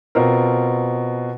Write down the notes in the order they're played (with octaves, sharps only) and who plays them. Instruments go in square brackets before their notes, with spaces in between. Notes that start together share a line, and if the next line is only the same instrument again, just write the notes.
[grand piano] B2 C4 F4 A#4